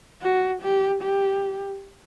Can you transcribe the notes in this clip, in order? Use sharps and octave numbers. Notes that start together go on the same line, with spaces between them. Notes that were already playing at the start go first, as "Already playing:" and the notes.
F#4
G4
G4